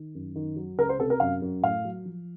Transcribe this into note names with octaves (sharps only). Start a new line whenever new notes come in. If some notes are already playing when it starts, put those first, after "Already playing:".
Already playing: D#3
F#2
D#3
F#3
C#2 A#4
C5
C3 A4
A#4
F#2 F5
F#2
A2 F5
F#3
F3